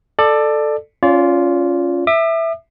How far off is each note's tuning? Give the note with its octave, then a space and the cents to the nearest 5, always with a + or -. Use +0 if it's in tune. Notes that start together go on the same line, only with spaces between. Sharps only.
A4 +0 D5 +20
C#4 +0 F4 +0 D5 -35
E5 +0 D6 +45